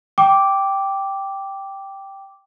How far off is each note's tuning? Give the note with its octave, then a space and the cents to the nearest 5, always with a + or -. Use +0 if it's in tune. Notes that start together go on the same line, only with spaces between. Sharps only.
G5 +0 D6 -5